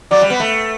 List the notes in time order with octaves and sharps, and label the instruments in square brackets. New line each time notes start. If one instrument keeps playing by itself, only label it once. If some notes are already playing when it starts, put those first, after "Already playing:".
[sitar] F#3 [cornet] D5
[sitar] G3
B3
A3